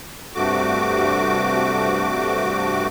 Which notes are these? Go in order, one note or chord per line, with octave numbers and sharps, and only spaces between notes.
G2 C3 A3 F#4 D6